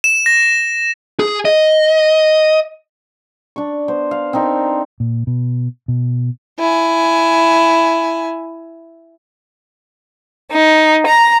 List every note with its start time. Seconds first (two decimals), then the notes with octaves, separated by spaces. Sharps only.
0.04 E7
0.26 A#6
1.20 G#4
1.45 D#5
3.56 D4 C#6
3.88 B3 C5
4.11 F5
4.33 C4 D4 D#4 A#4
5.00 A#2
5.27 B2
5.88 B2
6.59 E4 G#5
10.52 D#4
11.06 A#5